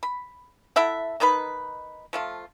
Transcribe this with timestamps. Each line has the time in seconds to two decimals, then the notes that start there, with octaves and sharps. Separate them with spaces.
0.03 B5
0.76 E4 A4 E5 F#5
1.20 D#3 D#4 B4 B5
2.13 F3 A3 F4